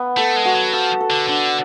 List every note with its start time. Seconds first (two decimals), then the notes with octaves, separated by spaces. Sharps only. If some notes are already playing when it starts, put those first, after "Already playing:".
Already playing: B3
0.17 A3 A4
0.36 G#3
0.45 F#4
0.55 F#3
0.73 F3 A4
1.00 A4
1.10 D3
1.28 D3 D4